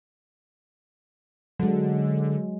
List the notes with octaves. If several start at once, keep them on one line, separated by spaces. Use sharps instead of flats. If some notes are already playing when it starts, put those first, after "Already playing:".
D3 F#3 G#3